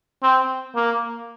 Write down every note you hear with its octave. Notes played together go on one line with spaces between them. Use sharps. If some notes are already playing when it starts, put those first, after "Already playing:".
C4
A#3